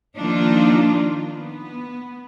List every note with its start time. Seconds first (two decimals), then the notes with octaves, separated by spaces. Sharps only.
0.19 D#3 F3 A#3 D4 D#4 F4
1.30 B3